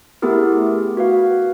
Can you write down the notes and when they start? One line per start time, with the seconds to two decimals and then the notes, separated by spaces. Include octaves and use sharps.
0.22 A3 B3 E4 G4 G#4 A#4
0.97 F#4 B4 F5